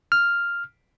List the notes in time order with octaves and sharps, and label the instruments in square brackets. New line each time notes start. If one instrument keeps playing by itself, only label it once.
[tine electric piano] F6